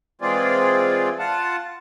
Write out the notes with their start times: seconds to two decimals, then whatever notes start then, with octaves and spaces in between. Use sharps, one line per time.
0.21 E3 G#3 C4 F4 G#4 D5
1.19 F4 F#5 A5